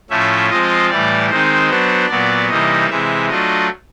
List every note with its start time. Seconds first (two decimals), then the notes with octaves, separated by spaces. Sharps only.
0.10 A2 F3 A3 C#4 E5
0.50 F3 G#3 C4 F4 D#5
0.90 A2 E3 G3 D5
1.30 D#3 G#3 C4 D#4 C5
1.70 F#3 B3 D4 C5
2.10 A#2 F#3 B3 D5
2.50 C3 E3 G3 A#3 D#4 D#5
2.90 C3 E3 G#3 E5
3.29 F#3 A3 D4 F4 D#5